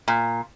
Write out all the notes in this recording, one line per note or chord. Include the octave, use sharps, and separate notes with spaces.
A#2